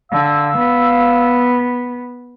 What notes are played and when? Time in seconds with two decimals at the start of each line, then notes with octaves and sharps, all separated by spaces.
0.11 D3 F5 E6
0.58 B3